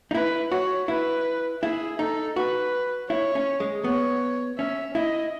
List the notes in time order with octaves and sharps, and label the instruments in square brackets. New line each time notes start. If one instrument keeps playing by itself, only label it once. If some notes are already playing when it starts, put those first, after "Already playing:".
[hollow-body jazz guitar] D#4
[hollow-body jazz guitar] E4 [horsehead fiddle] B4
[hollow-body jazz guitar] F#4 [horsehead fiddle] C#5
[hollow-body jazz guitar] E4 [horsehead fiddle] B4
[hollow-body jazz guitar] E4 [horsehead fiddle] G#4
[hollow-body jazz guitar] D#4 [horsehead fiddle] A4
[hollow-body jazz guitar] F#4 [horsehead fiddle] B4
[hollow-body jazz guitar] E4 [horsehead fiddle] C#5
[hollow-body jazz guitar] C#4
G#3
[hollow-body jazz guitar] B3 [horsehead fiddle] C#5
[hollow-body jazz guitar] C#4 [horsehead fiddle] E5
[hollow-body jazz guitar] E4 [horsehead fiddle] D#5